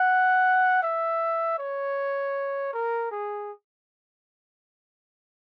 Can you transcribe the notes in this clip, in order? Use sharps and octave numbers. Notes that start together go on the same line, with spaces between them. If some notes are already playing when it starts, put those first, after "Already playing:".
Already playing: F#5
E5
C#5
A#4
G#4